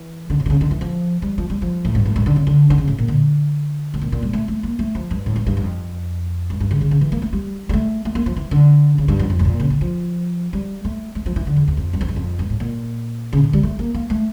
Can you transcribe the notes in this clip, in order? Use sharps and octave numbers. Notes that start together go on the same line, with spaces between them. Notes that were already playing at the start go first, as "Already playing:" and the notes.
Already playing: E3
D3
C#3
D3
C#3
D3
E3
F3
G3
F3
G3
F3
A2
G2
A2
G2
D3
C#3
D3
D3
C#3
A2
A#2
D3
A2
A#2
A#2
G3
A3
A3
A#3
A3
F3
G2
A2
G2
G2
F2
G2
G2
C#3
C#3
C#3
E3
A#3
A3
G3
G3
A3
A3
A#3
F3
E3
D3
C#3
G2
F2
F2
A2
A#2
C#3
D3
F3
G3
A3
A3
F3
E3
D3
E2
E2
F2
G2
F2
E2
F2
G2
A2
A#2
C#3
D3
G3
A3
A#3
A#3
A3